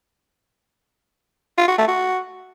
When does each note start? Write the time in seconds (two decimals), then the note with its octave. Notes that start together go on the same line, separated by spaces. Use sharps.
1.58 F4
1.68 F#4
1.78 A3
1.88 F#4